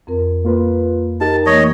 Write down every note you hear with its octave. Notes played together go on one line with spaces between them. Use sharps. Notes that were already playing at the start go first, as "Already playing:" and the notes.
F2 C4 A#4
A#3 F4 B4
D#4 G4 A#4 A5
E3 A3 A#3 C#5 D#5